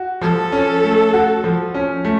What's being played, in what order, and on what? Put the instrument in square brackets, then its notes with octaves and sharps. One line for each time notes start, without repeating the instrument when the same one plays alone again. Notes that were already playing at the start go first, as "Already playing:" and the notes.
Already playing: [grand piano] F#4
[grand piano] F3 [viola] A4
[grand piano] C#4
A3
F#4
F3
C#4
A3